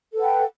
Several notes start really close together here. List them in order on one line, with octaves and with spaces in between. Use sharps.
A4 B4 F#5 G5